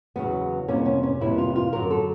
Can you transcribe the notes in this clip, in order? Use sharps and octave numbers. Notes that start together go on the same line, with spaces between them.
E2 C#3 F#3 B3
F2 C3 E3 G3 A#3 C#4
C#4
C#4
F2 C3 E3 G3 A#3 E4
F4
F4
F#2 D3 F#3 A#4
A4